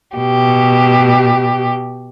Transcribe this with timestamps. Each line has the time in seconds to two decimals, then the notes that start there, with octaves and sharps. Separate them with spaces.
0.15 B2 G4